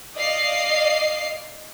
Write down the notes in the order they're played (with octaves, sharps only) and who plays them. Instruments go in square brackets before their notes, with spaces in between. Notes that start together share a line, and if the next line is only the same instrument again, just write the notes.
[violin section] D5 D#5 F5 C7